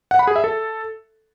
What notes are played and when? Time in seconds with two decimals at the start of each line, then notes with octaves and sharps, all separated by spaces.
0.11 F#5
0.19 B5
0.27 G#4
0.36 E5
0.44 A4